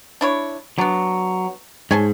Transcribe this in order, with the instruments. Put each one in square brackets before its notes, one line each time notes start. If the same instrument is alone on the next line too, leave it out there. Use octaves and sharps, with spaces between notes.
[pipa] D4 E4 C#5
[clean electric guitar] F#3 [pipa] B3 D4
[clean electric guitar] G#2 [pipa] C#5 G#5 A5